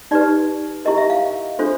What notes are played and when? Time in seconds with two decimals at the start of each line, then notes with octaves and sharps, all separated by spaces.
0.11 D#4 G4 B4 D5
0.85 E4 G4 A#4 D#5
0.98 E5
1.10 F5
1.59 D4 F4 A4 C5